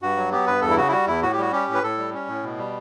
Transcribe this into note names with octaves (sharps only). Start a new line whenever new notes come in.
G2 F#4
F#3
B3 G4
G2 B4
E2 A4
E4
C#3 F#4
E4
G3 F#4
E2 E4
A2 F#4
G4
G3 F#4
C#4 G4
A2
B4
A2 A4
G3
C#4
A2
B2
G3